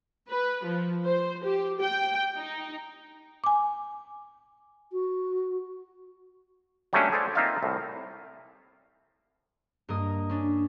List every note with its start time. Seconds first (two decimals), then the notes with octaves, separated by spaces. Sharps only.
0.29 B4
0.65 F3
1.05 C5
1.45 G4
1.81 G5
2.36 D#4
3.44 G#5 D6
4.92 F#4
6.93 F#3 G3 A3 A#3 C#4 D4
7.12 G#4 A4 C5 D5 A5
7.35 A#3 C4 D#4 F4 E5 F5
7.63 C2 A2
9.89 G2 A#3 A#4 D#5 D#6
10.30 C#4 D4